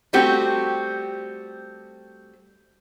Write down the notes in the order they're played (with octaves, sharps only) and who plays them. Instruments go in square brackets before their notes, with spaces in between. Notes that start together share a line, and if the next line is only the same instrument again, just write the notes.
[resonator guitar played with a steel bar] G3 A3 C4 F#4 G4